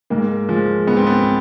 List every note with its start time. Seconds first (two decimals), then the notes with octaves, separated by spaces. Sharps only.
0.10 G#2 A#3
0.49 F3 G#3
0.87 G#2 B3
0.97 C4
1.07 B3